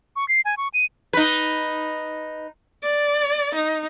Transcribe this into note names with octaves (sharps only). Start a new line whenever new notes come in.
C#6
C7
G#5
C#6
D#7
D#4 B4
D5
D#4